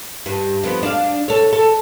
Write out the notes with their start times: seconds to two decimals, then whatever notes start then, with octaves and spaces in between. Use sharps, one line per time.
0.26 G2
0.64 F2 B3
0.83 D4 F5
1.28 A4 C#5
1.53 A4